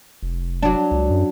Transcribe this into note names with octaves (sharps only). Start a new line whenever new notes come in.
F1
F#3 D4
C#2
F#2